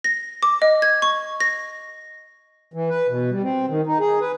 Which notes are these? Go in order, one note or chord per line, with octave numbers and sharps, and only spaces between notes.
A#6
D6
D#5
G#6
C#6
A#6
E3
B4
B2
G3
C4
D#3
D#4
G#4
B4